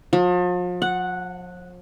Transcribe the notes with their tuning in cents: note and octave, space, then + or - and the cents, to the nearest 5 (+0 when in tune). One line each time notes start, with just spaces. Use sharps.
F3 +40
F#5 -5